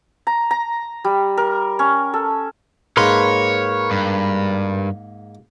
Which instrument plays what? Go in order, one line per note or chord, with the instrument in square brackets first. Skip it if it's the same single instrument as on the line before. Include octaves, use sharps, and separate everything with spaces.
[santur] A#5
A#5
G3
A#4
C#4
A4
[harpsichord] G#2 A#3 [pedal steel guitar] A#4 B4 C6 [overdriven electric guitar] C#5
[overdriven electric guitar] G2